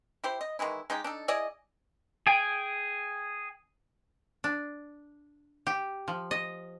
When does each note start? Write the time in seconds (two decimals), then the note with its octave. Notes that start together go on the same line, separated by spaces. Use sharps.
0.24 E4 G4 C5
0.41 D#5
0.59 D#3 E3 G#3 E4
0.90 G#3 D#4 G4
1.04 D4 D#4 A4
1.28 E4 G#4 D5 D#5
2.27 G#4 G5 G#5
4.44 D4
5.67 G4
6.08 F3
6.31 D#5